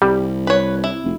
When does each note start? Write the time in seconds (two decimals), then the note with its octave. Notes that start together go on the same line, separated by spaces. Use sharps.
0.02 C2 G3
0.47 B4 C#5
0.84 E4
1.04 F1